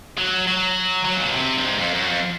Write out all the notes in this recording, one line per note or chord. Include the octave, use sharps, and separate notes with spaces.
F#3
F#3
F#3
A#2
B2
C3
G2
G#2
F2
F#2
F2